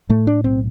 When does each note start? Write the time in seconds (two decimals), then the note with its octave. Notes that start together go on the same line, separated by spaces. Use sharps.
0.10 A2 A3
0.27 D4
0.44 B1 C4